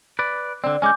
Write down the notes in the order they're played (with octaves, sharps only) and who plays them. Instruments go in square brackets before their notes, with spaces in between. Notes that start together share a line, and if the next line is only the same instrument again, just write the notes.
[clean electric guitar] B4 D5
[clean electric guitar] D3 C4 [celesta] D5
[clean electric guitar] G#3 C#4 [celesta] G#5 D6 G6